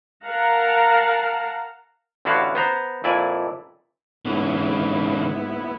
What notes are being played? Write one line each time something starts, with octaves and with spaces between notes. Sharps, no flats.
A#4 F5 F#5 A5 A#5
A1 D3 B3 E4 F#4 F5
B3 C5 A#5
F2 A#2 E4 D5 G#5
G#2 D3 B3 C#4 E4